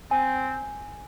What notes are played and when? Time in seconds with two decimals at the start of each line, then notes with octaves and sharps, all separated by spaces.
0.11 C4 G#5